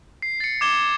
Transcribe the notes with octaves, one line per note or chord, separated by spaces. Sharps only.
C7
A6 C#7
D6 G#6 E7 G7